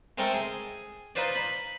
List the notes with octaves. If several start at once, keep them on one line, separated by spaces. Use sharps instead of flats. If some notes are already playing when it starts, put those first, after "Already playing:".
G#3 A3 C4 A4 A#4 G5
G#4
D#4 F4 B4 C5 D5
B5